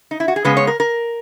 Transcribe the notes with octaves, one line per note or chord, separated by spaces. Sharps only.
D#4
E4
F#4
G#4
C#3 G#3 B3 B4
C#5
A#4
A#4